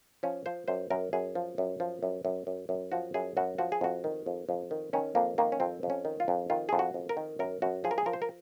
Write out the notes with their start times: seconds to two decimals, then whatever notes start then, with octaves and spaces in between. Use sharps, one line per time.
0.23 F3 C#4
0.46 F3 C5
0.68 F#2 C5
0.90 F#2 A#4
1.13 F#2 G#4
1.35 F3
1.58 F#2
1.80 F3
2.03 F#2
2.25 F#2
2.47 F#2
2.69 F#2
2.92 F3 F#4
3.14 F#2 G#4
3.37 F#2 F#4
3.58 F3 F#4
3.72 G#4
3.81 F2 F#4
4.04 D#3
4.26 F2
4.49 F2
4.71 D#3
4.93 D#3 C#4
5.15 F2 A#3
5.38 D#3 A#3
5.52 C#4
5.60 F2 C4
5.83 F2
5.90 C#4
6.05 D#3
6.20 F4
6.28 F2
6.50 D#3 F4
6.69 F2 G#4
6.79 F#4
6.94 F2
7.09 A#4
7.17 D#3
7.39 F#2 A#4
7.62 F#2 F#4
7.84 F3 G#4
7.91 A#4
7.98 G#4
8.06 F3 A#4
8.13 C5
8.22 A#4